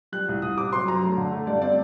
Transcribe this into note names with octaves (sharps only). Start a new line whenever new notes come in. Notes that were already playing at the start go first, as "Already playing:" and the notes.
G3 F#6
C2
C2 D#6
C3 D6
F#3 C6
F#2 A#5
A3
D3
A3
G2 D5
C4 D5